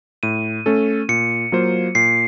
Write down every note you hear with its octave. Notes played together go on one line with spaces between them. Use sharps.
A2 D#7
A3 C#4 A4
A#2 C#7
F#3 A#3 F4 C5
A#2 C7